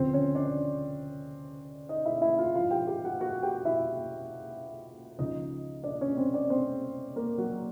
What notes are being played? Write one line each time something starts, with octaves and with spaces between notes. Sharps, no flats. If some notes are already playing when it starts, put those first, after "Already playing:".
Already playing: D2 C#3 F3 C4 C5
C#4 C#5
D4 D5
D#4 D#5
E4 E5
E4 E5
F4 F5
G#2 F3 F4 F5
G4 G5
G4 G5
F#4 F#5
F#4 F#5
G4 G5
E4 E5
C#2 C#3 F3 D#4 D#5
D4 D5
C#4 C#5
C4 C5
D4 D5
C4 C5
A#3 A#4
F#3 F#4